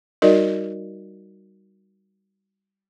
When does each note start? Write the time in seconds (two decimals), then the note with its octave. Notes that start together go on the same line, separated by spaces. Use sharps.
0.22 G3 D#4 F#4 A#4 D5 D#5